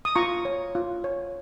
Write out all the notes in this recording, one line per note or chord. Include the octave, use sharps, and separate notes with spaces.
D#6
F4 A#5 C#6
C#5
F4
C#5